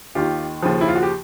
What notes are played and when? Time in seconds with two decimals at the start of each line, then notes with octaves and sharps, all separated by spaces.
0.15 D#2 D#3 F4 G4
0.63 D#2 C#3 F3
0.81 E4
0.88 F4
0.95 F#4
1.03 G4